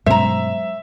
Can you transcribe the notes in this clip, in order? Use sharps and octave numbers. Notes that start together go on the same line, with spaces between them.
G2 B2 F#3 G#3 C#4 C5 E5 A#5